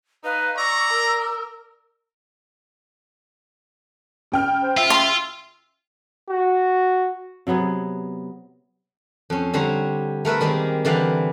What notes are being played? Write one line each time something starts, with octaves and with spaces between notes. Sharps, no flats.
D#4 B4 F5
D5 A#5 C#6 E6
A#4
C#3 G5 F6
C5
F4 E5
C6
F#4
C3 F#3 B3 G#4
F2 C#4
D3 G3 C5 C#5 A#5
A3 A#4 B4 E5
D#3 G3 G#3 A#3 C4
D3 E3 D5 F5 G5